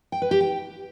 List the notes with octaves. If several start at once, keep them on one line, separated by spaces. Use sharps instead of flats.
G5
B4
G4
G5